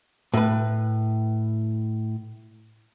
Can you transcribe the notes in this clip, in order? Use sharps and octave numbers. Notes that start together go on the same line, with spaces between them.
A2 B4